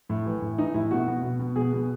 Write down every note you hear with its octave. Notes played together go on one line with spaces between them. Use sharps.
A2
E3
A2
E3 D#4
A2 E4
B2 F#4
B2
B2
B2
B2 G#4
B2